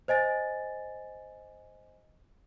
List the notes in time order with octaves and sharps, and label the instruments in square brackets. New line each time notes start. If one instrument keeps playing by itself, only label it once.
[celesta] C5 D#5 G#5 A6